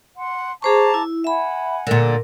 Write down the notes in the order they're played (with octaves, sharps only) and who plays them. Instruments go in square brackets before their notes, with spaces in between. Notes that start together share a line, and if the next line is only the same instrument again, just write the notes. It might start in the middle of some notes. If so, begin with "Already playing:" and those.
[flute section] F#5 C6
[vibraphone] G#4 C5 C#6 [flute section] A5 A#5 D6
[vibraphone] E4
[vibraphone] E5 B5 [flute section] F#5 G#5
[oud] A#2 D3 [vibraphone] A#4